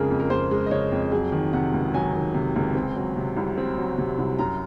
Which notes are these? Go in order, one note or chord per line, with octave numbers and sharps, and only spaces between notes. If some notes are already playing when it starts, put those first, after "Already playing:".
Already playing: F2 C#3 G#3 G#4 A#4
F2
A#4
F2 C5
G#3
D#5
C#3 C#5
F2
F#3 G#4
D#3
C3 F#5
C#2
F#3 G#5
D#3
C3
C#2
C4
F#3
C3
C2
C4
F#3
C3
C2
F#2 A#5